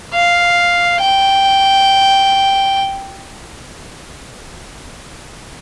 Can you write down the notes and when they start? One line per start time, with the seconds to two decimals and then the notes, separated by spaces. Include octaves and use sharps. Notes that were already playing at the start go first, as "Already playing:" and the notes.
0.14 F5
1.00 G5